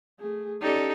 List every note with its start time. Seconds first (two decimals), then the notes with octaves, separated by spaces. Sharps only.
0.19 A3 G#4
0.62 C#4 D#4 G4 A4 D5